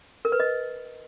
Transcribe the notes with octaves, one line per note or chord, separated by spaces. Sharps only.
A#4
B4
D#5